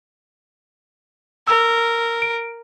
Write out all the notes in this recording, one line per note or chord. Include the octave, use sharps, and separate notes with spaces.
A#4 E6
D7